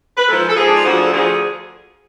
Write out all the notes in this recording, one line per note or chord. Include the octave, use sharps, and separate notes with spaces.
B4
G#2 F3 A4
A4
G#2 F3 G#4
D4
F4
D2 D3 F3 F#4
G#4
A4
D2 D3 F3 G#4